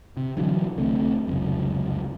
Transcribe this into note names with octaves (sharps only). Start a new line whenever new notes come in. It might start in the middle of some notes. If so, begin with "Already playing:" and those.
C3
D3 E3 F#3
C2 D3 A3 C4
F1 C#2 F#2